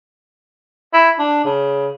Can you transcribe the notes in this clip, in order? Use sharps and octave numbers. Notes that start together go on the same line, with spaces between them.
E4
D4
C#3